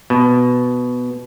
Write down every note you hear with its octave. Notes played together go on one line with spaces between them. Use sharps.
B2